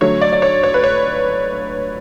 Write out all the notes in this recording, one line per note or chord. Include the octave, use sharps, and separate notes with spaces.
D3 F#3 A3 C#5
D5
D5
C#5
C#5
B4
C#5